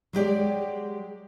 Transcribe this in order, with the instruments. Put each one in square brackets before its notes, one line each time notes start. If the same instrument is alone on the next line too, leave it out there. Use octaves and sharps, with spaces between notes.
[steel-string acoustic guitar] F#3 G#3 G4 D5